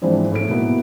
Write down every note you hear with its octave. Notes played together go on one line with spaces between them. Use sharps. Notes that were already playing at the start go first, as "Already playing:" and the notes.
G#2 E3 F3 C4 D4
A2 A4 D7
B2 A#3 B3 E4